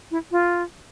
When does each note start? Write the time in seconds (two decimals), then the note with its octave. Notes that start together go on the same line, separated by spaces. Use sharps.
0.11 E4
0.32 F4